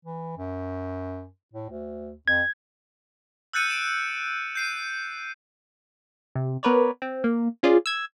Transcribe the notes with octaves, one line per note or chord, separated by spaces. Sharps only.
E3
F#2
A2
D2
F2 G#6
E6 F#6 G6 A6 C#7 D#7
D7 E7
G6 C7 D#7
C3
B3 A#4 B4 C#5 D5
C4
A#3
C#4 F4 G#4 D5
E6 G#6